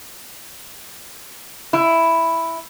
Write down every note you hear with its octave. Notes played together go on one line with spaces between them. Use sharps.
E4